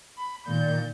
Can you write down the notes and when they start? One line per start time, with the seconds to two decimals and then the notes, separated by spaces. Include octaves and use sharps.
0.18 B5
0.47 A#2 D#3 D5 G6